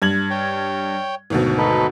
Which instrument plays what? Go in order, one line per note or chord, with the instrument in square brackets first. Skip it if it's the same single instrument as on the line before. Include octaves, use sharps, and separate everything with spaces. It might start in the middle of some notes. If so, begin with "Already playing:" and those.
[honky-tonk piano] G2 G#6 F#7
[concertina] C#5 G5
[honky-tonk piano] G#1 D2 B2
[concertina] D#4 A4 B4